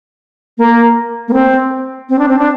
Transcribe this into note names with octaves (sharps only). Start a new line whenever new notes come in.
A#3
A#3
C4
C4
D4
C4
D4